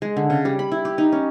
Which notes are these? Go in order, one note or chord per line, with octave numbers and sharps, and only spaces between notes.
G#3
D3
C#3
G3
B5
E4
G4
D#4
C#4